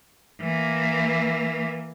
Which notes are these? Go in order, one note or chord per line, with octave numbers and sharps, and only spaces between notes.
E3 A#3